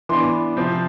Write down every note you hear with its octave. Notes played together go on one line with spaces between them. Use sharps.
E3 B3 D4 C6
C3 F3 C4